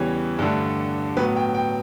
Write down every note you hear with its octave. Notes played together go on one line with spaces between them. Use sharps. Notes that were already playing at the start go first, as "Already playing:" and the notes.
Already playing: E2 C#3 E3 G3 C#5
G2 D3 A3
A2 F#3 B3 B4
G5
G5